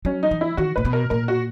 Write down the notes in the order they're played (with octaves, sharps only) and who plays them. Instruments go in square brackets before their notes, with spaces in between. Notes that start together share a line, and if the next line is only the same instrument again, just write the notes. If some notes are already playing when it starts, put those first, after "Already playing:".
[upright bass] F#3 [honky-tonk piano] C#4
[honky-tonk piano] D#4
[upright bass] E3
[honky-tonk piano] E4
[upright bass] D#3 [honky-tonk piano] F#4
[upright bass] A#2 [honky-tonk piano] B4
[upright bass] B2
[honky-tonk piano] A#4
[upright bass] A#2 [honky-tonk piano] A#4
[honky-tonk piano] F#4